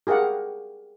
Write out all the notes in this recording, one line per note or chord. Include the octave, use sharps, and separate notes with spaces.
G4 G#4 A#4 F5 F#5